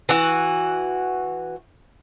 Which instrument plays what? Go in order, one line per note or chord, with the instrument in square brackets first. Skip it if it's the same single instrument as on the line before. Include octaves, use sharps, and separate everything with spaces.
[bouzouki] E3 F#4